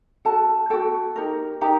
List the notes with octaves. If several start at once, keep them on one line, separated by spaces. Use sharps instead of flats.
F#4 A4 A5
F#4 A4 G5
D#4 G4 A#4
D#4 G4 A#4 A#5